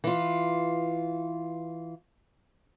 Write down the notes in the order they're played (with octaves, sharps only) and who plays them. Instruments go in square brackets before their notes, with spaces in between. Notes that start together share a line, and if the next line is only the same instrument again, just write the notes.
[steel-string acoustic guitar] E3 F4